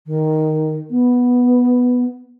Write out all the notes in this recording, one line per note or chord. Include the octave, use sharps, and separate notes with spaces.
D#3
B3